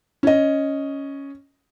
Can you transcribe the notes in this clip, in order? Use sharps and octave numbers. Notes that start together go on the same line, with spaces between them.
C#4 D#5